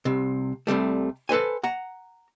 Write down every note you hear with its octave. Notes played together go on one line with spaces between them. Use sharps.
C2 C3
C2 C3 G3 A3
A4 B4 C5 G#5
F#5 A#5